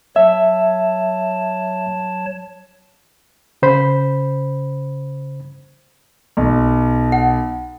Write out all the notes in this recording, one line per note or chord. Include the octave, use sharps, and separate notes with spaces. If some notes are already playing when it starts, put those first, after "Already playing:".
F#3 C#5 E5 A5
C#3 C5 B5
B1
F#5